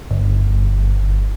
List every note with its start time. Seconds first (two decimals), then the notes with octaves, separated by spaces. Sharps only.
0.11 G1